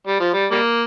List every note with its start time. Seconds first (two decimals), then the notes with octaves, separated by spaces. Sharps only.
0.07 G3
0.20 F3
0.33 G3
0.51 G3 A#3